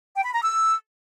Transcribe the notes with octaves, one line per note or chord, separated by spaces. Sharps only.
G5
B5
A#5
E6